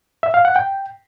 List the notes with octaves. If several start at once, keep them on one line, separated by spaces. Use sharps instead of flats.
E5
F5
F#5
G5